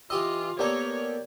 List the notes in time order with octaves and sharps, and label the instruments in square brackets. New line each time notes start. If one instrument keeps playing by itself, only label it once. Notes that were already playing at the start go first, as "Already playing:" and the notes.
[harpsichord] E3 G4 D#5 [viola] F4 [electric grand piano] E6
[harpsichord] A#3 B3 A4 [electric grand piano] G4 A#4 D5 [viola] C#5